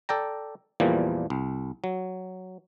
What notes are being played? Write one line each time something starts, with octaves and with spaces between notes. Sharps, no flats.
A4 D5 G5 A#5
E2 A#2 E3 F3 G3 A#3
C2
F#3